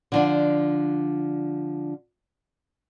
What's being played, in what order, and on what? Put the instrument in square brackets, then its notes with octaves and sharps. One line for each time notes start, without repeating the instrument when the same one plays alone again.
[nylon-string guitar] D3 F3 D4